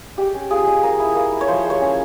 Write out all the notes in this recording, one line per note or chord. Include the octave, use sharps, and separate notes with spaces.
G#3 G4
C#4
F4 G#4
G#3
A#3 A#4
E4
A#3
E4
C#5
F3 C5
G#3
C#5
C#4